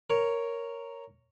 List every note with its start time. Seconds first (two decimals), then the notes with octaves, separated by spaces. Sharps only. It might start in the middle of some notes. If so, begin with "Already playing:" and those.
0.10 A#4 C#5